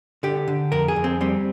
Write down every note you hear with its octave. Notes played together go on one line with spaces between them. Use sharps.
D3 G4
D3
F2 A#4
G#4
F2
C4
G3 C4